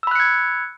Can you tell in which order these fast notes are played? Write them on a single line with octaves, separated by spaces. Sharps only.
E6 B5 F#6 C#7 G#6